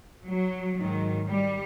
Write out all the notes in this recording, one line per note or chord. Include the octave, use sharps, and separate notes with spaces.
F#3
G#2 D#3 F#3
G3